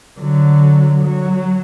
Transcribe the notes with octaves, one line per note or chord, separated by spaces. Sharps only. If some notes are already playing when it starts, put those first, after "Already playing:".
D3 F#3
F#3